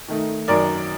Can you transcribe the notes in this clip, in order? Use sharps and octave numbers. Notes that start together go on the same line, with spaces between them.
D#3 A3 D#4
F#2 D#3 F#3 A#4 D5